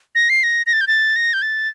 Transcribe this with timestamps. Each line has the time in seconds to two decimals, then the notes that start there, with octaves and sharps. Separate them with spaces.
0.15 A#6
0.29 C7
0.43 A#6
0.66 A#6
0.73 A6
0.81 G6
0.87 A6
1.16 A#6
1.33 G6
1.42 A6